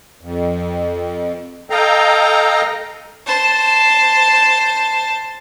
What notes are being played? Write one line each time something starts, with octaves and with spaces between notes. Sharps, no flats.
F2
A4 D#5 F5 G5 A#5
C5 A5